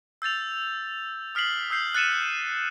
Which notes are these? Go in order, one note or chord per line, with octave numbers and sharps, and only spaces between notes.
E6 G6 A6 F7
D#6 F6 B6 C7 F#7
D#6 E6 G6 C7
F#6 A6 C#7 D#7 E7